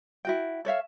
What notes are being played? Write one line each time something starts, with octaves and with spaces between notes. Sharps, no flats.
E4 F#4 G5
A4 C#5 E5 F5